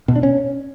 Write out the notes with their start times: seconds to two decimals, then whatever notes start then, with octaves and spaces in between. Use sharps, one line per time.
0.08 B2
0.16 D4
0.23 C#4